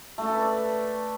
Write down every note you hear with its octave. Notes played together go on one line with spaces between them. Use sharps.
A3
A4
B4
D5